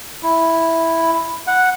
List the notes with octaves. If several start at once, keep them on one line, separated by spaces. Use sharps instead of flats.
E4
F#5